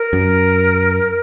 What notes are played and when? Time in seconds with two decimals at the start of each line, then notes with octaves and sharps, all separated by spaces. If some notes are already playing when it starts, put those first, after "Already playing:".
Already playing: A#4
0.13 F#2